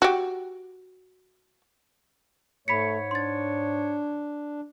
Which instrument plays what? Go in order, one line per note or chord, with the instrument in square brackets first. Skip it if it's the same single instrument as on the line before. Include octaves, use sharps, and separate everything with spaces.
[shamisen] F#4 G4
[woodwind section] G#2 C#5 [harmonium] A3 [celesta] B5 B6 C#7
[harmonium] D4 [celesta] C6 A6